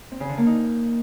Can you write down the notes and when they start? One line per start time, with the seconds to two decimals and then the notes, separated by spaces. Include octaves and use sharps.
0.12 C4
0.20 C#3
0.29 D3
0.38 A#3
0.46 D#4